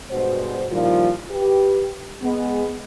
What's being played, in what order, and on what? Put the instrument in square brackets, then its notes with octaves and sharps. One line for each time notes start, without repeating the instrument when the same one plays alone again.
[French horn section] G2 B2 G#3 F#4 C5
A#2 D#3 F3 G3 E4 F4
G4 B4
G#3 B3